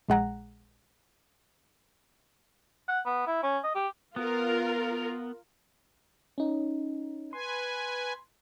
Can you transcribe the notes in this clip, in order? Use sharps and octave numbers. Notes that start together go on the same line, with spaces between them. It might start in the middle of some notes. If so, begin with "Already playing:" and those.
A#1 G#3 F#5 A#5
F#5
B3
E4
C#4
D#5
G4
B3 F4 A#4
C#4 D#4
B4 G#5 C6